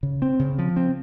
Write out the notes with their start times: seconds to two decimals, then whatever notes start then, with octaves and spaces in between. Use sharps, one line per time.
0.03 C#3
0.22 C4
0.39 C#3
0.59 F3
0.76 C4